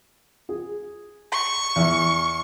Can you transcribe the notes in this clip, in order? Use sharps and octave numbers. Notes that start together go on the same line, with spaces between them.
G#4
C#6
E2